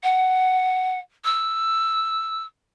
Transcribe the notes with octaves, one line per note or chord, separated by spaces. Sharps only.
F#5
E6